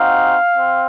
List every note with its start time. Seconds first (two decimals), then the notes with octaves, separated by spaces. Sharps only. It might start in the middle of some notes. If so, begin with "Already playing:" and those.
Already playing: C4 D#4 F#4 F5
0.58 C4